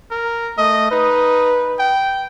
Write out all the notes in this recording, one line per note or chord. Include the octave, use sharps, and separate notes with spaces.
A#4
A3 D#5
D#4 B4
G5